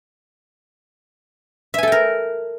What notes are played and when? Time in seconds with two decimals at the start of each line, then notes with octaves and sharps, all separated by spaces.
1.74 E5
1.78 G#5
1.83 A4
1.87 G5
1.92 A#4